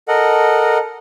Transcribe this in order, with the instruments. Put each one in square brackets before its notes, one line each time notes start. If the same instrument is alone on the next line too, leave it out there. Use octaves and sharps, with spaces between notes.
[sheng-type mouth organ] A4 A#4 D#5 F#5